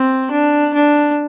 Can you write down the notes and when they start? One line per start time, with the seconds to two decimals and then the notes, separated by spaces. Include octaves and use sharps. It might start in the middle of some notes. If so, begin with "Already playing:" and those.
Already playing: C4
0.31 D4
0.74 D4